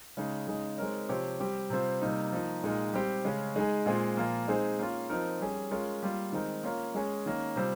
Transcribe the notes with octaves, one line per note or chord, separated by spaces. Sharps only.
C#3 G#3 D#4
C#3 G#3 D#4 G#4
G#3 C4 D#4 A#4 C#5
C3 F3 C4 G4 C#5
G3 C4 G4
C3 G3 C4 F4 C5
C3 G3 A#3 D#4
F3 A#3 D#4
A#2 G#3 D#4 A#4
G3 C4 G4
C#3 G#3 C#4
G#3 D#4 G#4
A#2 G#3 C4 F4
A#2 F3 A#3
G#3 C4 D#4 G#4 C5
A#3 C#4 F4
F3 C4 D#4 A#4
G3 C#4 G#4
G#3 C#4 F4 A#4 C#5
G3 A#3 F4
D#3 G#3 C4 D#4 A#4
A#3 C#4 F4 A#4 C#5
G#3 C#4 G#4 C#5
D#3 A#3 C#4
C3 G3 C4 F4 C5